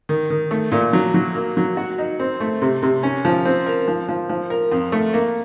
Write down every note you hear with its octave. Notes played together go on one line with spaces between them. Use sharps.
D#3
D#3
A3
A#2
F#3
F#3
A#3
F#3
F#4
D#4
C4
A3
C3
C3
C#4
F3
C4
A#4
F3
F3
F3
A#4
F2
A3
A#3